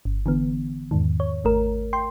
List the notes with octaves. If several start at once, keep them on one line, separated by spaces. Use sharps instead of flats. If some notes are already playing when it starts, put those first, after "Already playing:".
G1
D3 E3 B3
E2 G#2 D#3
C#5
G#1 A3 A#4
G5 C6